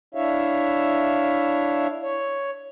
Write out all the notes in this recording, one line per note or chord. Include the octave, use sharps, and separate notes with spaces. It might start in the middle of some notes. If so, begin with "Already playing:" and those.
D4 E4 C#5 E5 F5
C#5